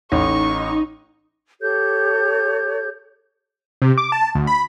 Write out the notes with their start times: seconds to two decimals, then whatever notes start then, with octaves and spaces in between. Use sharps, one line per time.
0.12 A1 D#4 C#6
1.61 G4 A4 C#5 G6
3.82 C3
3.98 D6
4.12 A5
4.35 D2
4.47 B5